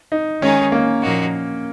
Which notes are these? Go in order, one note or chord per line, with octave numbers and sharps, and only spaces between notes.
D#4
D#3 G#3 C#4 D#4 G#4
A#3
A#2 F3 A#3 D#4 F#4